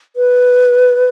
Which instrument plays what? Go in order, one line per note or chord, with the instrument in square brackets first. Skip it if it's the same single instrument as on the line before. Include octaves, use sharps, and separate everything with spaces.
[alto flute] B4